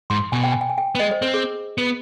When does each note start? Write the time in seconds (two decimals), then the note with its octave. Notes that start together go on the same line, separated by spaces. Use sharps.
0.10 G#2 C6
0.32 B2 G#5
0.44 G5
0.52 G#5
0.61 G5
0.70 G#5
0.78 G5
0.95 B3
1.00 G#3 D#5
1.11 C5
1.22 C4 B4
1.34 G#4
1.78 B3